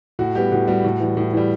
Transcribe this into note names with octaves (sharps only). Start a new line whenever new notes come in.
A2 F#4
G3 B3 G4
A2 F#4
G3 B3 F#4
A2
E3 G3
A2
E3 G3